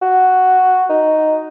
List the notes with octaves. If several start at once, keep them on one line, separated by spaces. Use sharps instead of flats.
F#4
D#4